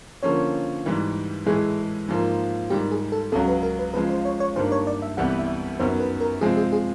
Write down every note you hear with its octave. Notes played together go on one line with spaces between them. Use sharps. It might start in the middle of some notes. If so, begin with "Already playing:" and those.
D3 F3 A#3 C#4 C#5
G#2 E3 G3
A2 E3 G#3 G#4
G#2 F3 A#3
G#2 D#3 G3 G4
G#4
A4
C#2 C#3 F#3 A4
B4
A#4
B4
C#3 F3 G#3 B4
C5
C#5
C#5
G2 D#3 G3 A#3 D4 C5
C#5
D5
E5
C2 C3 E3 G3 B3 F#5
E5
F#2 D#3 F#3 B3 C5
B4
A#4
C3 F3 G#3 C4 G#4
G#4
G#4